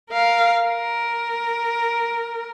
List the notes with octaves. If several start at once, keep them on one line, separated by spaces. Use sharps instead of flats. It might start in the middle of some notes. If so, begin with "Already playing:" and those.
A#4 F5
A#4